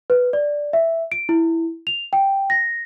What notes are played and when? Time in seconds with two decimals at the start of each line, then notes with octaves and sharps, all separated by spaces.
0.10 B4
0.33 D5
0.73 E5
1.12 D7
1.29 E4
1.87 F7
2.13 G5
2.50 A#6